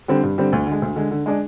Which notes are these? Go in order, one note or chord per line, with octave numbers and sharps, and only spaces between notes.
D3 G3 C4
G2
D3 G3 C4
D2
D3 G#3
D2
D3 G#3
D3
G#3 D4 G#4